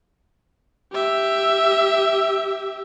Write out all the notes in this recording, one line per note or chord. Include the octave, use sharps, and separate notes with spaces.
G4 E5